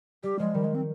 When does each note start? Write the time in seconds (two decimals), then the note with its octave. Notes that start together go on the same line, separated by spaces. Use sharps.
0.23 G3 G4
0.39 F3 G#3
0.55 D#3 G3
0.64 G#3
0.75 C4